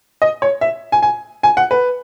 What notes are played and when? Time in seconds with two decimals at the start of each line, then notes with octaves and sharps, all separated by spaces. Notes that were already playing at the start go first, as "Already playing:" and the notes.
0.22 D#5
0.42 C#5
0.61 E5
0.92 G#5
1.02 G#5
1.43 G#5
1.57 F#5
1.71 B4